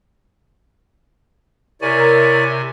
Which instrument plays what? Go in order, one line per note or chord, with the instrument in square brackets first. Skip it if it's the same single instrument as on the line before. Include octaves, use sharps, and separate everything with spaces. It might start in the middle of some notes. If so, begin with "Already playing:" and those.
[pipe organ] C3 G#5 [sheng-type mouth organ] E4 C#5 D5 [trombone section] A#4